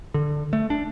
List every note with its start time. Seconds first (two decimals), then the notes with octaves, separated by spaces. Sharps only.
0.14 D3
0.53 A3
0.70 D4